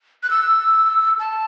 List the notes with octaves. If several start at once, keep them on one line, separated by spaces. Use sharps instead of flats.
F#6
E6
A5